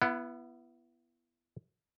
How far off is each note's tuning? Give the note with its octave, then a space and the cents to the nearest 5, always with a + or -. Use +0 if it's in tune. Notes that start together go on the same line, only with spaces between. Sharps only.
B3 -5 E4 +30 F#5 +0